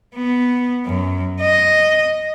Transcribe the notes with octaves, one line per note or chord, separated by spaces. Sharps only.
B3
F#2
D#5